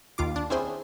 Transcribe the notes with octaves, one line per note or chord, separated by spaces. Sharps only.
D#2 F4 D6
D4
C4 C#4 E4 G#4 C5